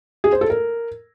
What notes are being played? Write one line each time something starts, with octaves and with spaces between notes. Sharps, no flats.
G#4
C5
A4
A#4